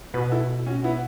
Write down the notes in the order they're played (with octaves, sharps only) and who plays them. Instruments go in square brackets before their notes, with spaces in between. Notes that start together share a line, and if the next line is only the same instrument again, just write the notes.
[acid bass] B2 [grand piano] F#4 B4
[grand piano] E4 A4
C#4 F#4
B3 E4